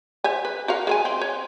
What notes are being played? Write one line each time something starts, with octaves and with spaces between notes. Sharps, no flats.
C5 E5 G#5
B4
F#4 A#4 F5
G#3 A#4 G#5
C4
C#5